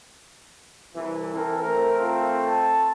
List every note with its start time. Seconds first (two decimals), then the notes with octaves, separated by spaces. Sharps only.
0.95 C2 E3
1.34 E3 C4 A4 A#4
1.62 A3 C4 A#4
2.00 F4
2.44 A5